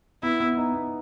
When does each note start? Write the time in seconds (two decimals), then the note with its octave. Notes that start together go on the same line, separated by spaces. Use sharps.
0.23 B3 E4
0.40 B3
0.57 D#4
0.74 B3